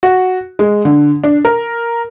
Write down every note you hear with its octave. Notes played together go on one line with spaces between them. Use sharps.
F#4
G#3
D3
D4
A#4